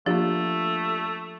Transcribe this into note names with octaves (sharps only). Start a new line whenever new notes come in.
F3 A3 A#3 D4 F4 G4